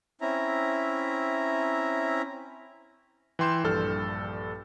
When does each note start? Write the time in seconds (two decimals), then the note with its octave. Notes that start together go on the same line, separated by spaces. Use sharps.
0.21 C4 C#4 E4 E5 A#5
3.39 E3 G5 C6 G6 E7
3.63 A#1 G2 A4 F6